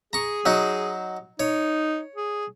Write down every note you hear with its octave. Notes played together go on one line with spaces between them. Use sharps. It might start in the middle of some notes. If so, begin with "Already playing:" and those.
G#4 A#5 C#6
F#3 D#4 F#4
D#4 C#5
G#4